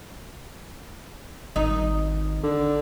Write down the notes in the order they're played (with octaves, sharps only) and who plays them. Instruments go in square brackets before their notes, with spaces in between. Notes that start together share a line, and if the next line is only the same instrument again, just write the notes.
[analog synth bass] G#1 [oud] D#4
[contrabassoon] D3